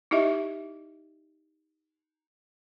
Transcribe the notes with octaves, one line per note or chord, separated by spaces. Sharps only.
D#4 E4 G4 D#5 E5